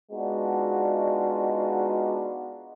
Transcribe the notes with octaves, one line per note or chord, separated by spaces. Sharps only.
G#3 B3 D4 D#4 F4 F#4